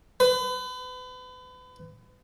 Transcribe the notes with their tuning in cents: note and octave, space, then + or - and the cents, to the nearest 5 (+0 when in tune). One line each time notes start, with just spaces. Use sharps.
B4 +35